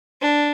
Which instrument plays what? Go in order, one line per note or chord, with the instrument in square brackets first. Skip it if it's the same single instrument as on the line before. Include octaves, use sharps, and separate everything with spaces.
[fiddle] D4